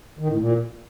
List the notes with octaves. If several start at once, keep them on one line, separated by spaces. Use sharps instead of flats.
D#3
A2
A#2